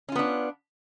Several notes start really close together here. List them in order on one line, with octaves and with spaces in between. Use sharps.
C#4 F4 B3 D4